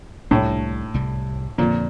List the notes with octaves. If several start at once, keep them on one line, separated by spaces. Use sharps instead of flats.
C2 A2 C3 G3
C2 C3 G3
F2 A#2 D3 F3